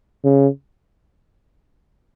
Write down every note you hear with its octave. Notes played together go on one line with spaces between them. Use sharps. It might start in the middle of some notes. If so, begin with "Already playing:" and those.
C#3